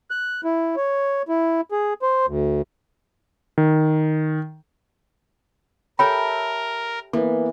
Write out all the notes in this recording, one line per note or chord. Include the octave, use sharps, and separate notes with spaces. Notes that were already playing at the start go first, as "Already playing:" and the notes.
F#6
E4
C#5
E4
G#4
C5
D2
D#3
G4 A4 A#4 C#5 E5 G5 B5
E3 A#3 B3 A4